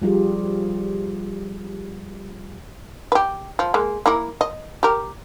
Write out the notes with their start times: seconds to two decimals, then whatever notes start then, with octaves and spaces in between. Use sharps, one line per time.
0.02 F3 G3 F4 G4 G#4
3.12 G4 B4
3.59 F3
3.74 G#3 A#3
4.06 A#3 E4 A#4
4.41 D#5
4.83 G4 A#4